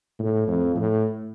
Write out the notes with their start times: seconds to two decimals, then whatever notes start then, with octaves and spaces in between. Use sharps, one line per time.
0.19 A2
0.47 F2
0.76 A2